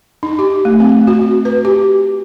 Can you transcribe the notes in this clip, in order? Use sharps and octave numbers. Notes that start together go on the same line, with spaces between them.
D#4
G4
A3
C4
F#4
B4
G4